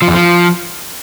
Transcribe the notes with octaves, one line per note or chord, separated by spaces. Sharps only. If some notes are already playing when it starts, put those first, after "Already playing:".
F3
E2
F3